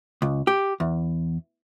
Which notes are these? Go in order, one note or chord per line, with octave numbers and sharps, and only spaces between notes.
C#2
G4
E2